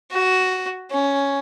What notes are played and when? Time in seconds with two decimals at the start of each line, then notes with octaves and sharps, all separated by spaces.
0.12 F#4
0.91 C#4